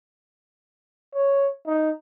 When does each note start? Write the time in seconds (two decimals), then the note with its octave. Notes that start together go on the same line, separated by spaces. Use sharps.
1.15 C#5
1.67 D#4